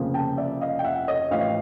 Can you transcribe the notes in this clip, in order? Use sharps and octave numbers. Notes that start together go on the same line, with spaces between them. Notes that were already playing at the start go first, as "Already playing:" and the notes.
Already playing: F1 F2 C#3 F3 A#3
G5 A5
D5 E5
D#5 F5
G5
E5 F#5
C#5 D#5
A1 A2 F3 D#5 F5